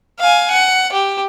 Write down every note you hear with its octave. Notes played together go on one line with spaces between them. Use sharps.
F5 G#5
F#5
G4